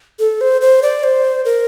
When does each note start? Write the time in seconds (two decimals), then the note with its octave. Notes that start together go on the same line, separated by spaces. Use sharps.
0.19 A4
0.41 C5
0.61 C5
0.83 D5
1.04 C5
1.45 A#4